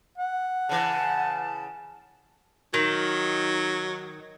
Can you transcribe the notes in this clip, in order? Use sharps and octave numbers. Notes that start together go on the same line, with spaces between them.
F#5
C#3 E3 A5
D#3 F#3